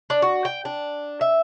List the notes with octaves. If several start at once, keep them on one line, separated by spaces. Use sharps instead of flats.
D4
F#4
G5
D4
E5